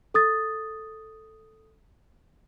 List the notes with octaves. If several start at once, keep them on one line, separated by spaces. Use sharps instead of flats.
A4 D#6 A6